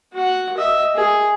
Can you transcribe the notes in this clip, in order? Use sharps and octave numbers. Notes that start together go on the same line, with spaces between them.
F#4 F#5
D#5 E5
G#4